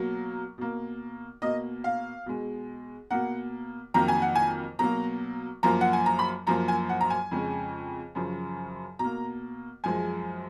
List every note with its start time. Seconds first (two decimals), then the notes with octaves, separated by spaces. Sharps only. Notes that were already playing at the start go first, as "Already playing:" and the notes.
Already playing: B2 F#3 A#3
0.58 B2 A#3
1.42 B2 A#3 D#5
1.84 F5
2.26 B2 G#3
3.11 B2 A#3 F#5
3.94 F2 D#3 F#3 A#3 A#5
4.08 G#5
4.22 F#5
4.35 G#5
4.79 B2 F#3 A#3 A#5
5.63 F#2 F3 A#3 A#5
5.81 F#5
5.93 G#5
6.06 A#5
6.19 B5
6.47 F#2 F3 A#3 A#5
6.68 G#5
6.89 F#5
7.01 A#5
7.10 G#5
7.31 F2 C#3 G#3
8.15 F#2 C#3 F3
8.99 B2 A#3 A#5
9.84 F#2 F3 G#3 G#5